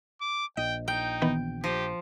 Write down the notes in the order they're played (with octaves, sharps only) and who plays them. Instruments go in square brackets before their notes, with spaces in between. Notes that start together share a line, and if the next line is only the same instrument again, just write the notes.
[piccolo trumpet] D6
[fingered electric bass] A#1 [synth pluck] D#5 [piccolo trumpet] G5
[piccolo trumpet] D#4 [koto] G5
[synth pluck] D#3 E3 B3
[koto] F3 [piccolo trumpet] G4 [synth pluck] A#6 D7